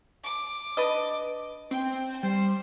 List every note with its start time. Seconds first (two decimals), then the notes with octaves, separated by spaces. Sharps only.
0.24 D6
0.77 D4 B4 D#5
1.71 C4 G5
2.23 G3 C5